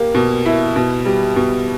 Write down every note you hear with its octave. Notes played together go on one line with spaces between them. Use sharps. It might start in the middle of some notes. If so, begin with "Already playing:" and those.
Already playing: A#3 G4
B2
E4
B2
G3
B2